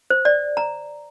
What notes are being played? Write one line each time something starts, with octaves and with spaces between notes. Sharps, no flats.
C5
D5
A#5